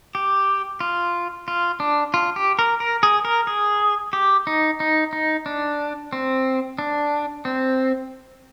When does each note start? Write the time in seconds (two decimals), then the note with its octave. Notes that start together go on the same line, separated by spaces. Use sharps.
0.15 G4
0.80 F4
1.48 F4
1.80 D4
2.14 F4
2.36 G4
2.59 A#4
2.80 A#4
3.03 G#4
3.25 A#4
3.47 G#4
4.13 G4
4.47 D#4
4.80 D#4
5.13 D#4
5.46 D4
6.13 C4
6.79 D4
7.45 C4